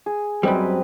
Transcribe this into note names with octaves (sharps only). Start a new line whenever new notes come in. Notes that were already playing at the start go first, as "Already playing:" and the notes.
G#4
F#2 G3 C4 B4 D#5